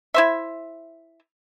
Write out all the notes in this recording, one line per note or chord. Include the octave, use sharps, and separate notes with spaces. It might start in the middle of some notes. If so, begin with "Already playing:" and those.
E4 C5 E5